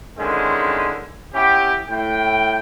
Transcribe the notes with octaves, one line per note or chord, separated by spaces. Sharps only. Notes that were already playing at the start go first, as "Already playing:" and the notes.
D3 D#3 G#3 C4 C#4 E4
B3 C#4 E4 G4
A2 G5